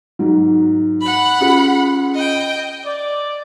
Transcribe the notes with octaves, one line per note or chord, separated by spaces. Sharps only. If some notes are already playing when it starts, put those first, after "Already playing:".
G#2 F#3
F#5 B5
C#4 F4 G#4
D#5 G5
D5